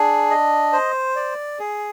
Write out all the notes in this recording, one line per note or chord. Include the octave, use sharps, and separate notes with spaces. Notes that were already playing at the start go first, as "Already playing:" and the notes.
Already playing: D4 G#4
D#5
C5
D5
G#4